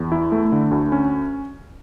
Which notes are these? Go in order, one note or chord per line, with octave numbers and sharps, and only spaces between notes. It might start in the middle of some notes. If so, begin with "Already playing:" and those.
Already playing: E2
E4
A3
D3
D2
C#4